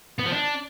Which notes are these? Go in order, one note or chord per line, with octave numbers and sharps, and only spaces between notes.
B3
F3
D4